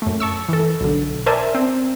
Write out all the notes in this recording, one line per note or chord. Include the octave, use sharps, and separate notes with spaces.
F#2 A3
A5 C#6 E6
E3 A4
B1 D3
A#4 C5 D5 E5 G#5 A5
C4